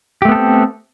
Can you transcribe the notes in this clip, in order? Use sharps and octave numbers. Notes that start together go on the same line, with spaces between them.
A3 B3 C4 G4 A4